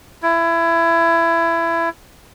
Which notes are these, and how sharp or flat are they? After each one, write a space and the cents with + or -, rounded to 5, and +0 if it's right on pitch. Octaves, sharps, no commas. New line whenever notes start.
E4 +20